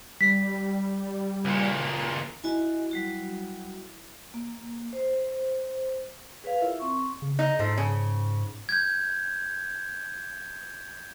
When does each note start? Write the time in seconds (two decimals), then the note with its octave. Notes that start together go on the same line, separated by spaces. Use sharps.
0.21 G3 B6
1.45 C#2 A#2
2.44 E4 F#4 D#5 G#5
2.91 F#3 G3 F#4
4.34 A#3
4.93 C5
6.44 G#4 B4 C#5 F5
6.61 E4 F4 A#4 E5
6.79 C4 C#6
7.22 C#3
7.39 D#4
7.59 G#2 F3 A3
7.77 C#3
8.69 G6 G#6